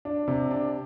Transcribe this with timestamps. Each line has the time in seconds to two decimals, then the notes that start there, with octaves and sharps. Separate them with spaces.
0.05 D4
0.28 C3
0.51 D4